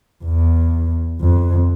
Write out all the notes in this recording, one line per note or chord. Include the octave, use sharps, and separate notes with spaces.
E2
F2